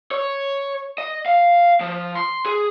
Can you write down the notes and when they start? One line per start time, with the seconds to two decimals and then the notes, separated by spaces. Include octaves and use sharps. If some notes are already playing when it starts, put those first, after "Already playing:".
0.11 C#5
0.98 D#5
1.26 F5
1.80 F3
2.15 C6
2.46 G#4